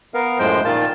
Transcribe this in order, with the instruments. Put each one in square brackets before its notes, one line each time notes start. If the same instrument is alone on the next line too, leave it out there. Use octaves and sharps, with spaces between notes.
[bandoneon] B3 A#4 F5
F#2 A2 F3 G#3 C5 G5
A#2 D#3 F4 A5